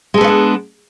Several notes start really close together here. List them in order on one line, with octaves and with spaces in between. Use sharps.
G#3 A4 B3 F4 D4